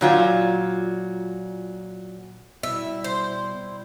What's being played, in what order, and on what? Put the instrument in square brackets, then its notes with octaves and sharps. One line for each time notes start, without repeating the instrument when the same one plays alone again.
[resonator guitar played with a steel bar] A#2 F#3 F4
[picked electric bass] B2 [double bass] G3 E4 [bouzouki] E5
[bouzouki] C5